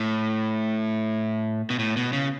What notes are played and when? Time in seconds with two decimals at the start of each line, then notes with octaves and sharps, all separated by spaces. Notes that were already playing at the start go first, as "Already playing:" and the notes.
Already playing: A2
1.70 B2
1.79 A2
1.96 B2
2.13 C#3